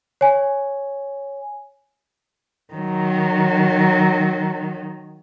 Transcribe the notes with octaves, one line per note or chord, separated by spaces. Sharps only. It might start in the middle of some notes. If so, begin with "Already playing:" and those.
C#5 G#5
D#3 F#3